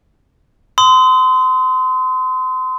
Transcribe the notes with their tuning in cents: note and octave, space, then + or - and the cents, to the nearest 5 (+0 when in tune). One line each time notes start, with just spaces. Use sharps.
C6 -30 D#6 +30